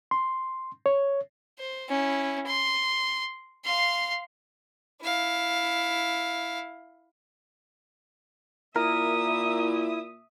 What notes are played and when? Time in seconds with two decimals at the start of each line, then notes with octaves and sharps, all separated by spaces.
0.11 C6
0.86 C#5
1.59 C5
1.89 C#4 E4
2.47 C6
3.65 F5 C6
5.01 E4 F5
8.76 A#2 E4 A#4 E5 D#6